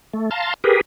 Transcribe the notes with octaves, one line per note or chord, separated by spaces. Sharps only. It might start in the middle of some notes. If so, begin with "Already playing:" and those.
A3
F5 A5 A#5 C6
G4 G#4 A#4 B4